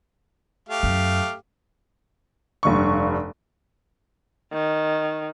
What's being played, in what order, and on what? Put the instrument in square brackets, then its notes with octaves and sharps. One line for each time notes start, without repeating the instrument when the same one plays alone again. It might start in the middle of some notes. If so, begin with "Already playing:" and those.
[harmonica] A3 G4 F5
[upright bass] F#2
[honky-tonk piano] F1 G2 C#6
[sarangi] D#3